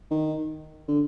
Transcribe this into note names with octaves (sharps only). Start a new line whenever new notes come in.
D#3
D3